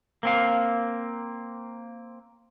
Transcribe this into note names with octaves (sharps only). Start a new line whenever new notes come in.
A#3 C4 F5